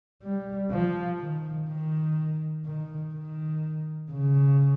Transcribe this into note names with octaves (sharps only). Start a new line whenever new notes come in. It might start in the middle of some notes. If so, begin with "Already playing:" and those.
G3
F3
D#3
D#3
D#3
D#3
C#3